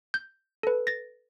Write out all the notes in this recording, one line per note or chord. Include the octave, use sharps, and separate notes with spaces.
G6
A4 B4
A6 A#6